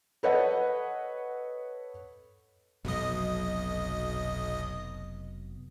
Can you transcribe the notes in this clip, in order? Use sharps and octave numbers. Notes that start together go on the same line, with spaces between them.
A4 B4 C#5 D#5 F#5
F1 B1 B2 F#3 D#5